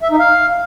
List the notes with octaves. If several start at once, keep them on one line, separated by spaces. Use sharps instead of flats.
E5
D#4
F5